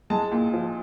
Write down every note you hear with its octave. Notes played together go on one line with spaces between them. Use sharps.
G#3 A5
A#2
F3